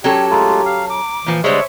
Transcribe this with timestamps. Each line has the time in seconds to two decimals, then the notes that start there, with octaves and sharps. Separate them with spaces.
0.04 F#3 C#4 G4 A4 G5
0.31 G#3 A3 F4 A#5
0.66 F5
0.90 D6
1.26 A#2 E3 F3
1.44 D3 G3 G#3 C5 C#5 E5 C#6